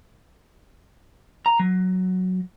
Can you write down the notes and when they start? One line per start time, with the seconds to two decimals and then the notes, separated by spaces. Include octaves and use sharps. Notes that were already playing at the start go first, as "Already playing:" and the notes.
1.46 A#5
1.60 F#3